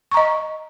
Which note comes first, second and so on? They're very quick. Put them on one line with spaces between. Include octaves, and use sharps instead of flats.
C#6 A#5 D#5